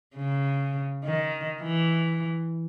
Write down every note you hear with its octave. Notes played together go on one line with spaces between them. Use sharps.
C#3
D#3
E3